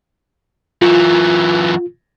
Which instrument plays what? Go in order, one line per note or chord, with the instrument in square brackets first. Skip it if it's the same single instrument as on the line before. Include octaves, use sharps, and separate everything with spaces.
[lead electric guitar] F#2 E3 [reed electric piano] F4